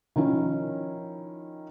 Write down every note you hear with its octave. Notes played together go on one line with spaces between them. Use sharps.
D#3 F3 C#4 E4